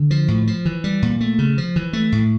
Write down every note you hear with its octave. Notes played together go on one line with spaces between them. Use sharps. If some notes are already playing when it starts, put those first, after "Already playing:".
Already playing: D3
F3
A2
F3
E3
G3
A#2
A3
C#3
F3
E3
A3
A2